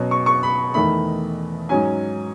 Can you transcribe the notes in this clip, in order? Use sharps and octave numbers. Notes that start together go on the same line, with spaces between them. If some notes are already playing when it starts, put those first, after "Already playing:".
Already playing: B2 F#3 C#4
C#6
C#6
B5
E2 D#3 A3 B5
G#2 F#3 C#4 G#5